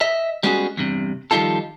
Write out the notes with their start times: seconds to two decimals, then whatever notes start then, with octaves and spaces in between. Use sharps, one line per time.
0.01 D#5 E5
0.43 G3 G#3 B3 C#4 F#4 G#4
0.77 E2 G2 C3
1.31 D#3 F3 G3 D#4 F4 A4